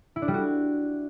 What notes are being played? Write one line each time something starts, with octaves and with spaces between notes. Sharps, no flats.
E4
D4
G3
F#4